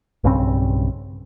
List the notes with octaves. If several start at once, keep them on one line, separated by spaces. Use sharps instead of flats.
B1 G2 C#3 C4